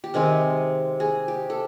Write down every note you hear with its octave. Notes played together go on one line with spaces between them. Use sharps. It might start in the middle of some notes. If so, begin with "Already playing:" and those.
G4
C3 D#3 G#3 C4 G#4
G#4
G4
A4